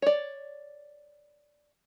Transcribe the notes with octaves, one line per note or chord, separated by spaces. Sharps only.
C#5 D5